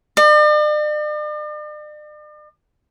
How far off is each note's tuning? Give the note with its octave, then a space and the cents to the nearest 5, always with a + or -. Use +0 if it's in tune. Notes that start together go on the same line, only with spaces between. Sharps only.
D5 +45